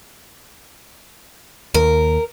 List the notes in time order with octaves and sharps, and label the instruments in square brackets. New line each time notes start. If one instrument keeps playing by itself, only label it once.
[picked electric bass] D#2 [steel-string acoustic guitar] A#4